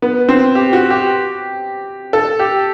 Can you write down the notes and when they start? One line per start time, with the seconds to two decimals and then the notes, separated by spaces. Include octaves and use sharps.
0.02 B3
0.29 C4
0.55 G4
0.73 F#4
0.90 G4
2.13 A4
2.39 G4